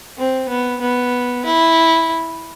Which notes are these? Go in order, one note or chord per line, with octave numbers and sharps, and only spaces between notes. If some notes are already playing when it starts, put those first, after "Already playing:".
C4
B3
B3
E4